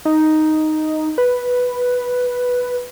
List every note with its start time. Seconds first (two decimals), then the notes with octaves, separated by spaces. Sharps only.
0.05 D#4
1.18 B4